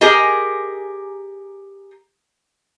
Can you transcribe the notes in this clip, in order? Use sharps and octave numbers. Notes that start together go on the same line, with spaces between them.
G4 G#4 A#4 D#5 G#5